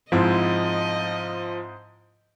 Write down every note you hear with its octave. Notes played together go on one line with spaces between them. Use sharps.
G#2 F3 C4 E4 D#5